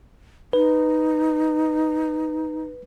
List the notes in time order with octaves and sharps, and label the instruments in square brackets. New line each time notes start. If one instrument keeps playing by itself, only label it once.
[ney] D#4 [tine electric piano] B4